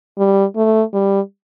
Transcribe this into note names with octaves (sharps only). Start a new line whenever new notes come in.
G3
A3
G3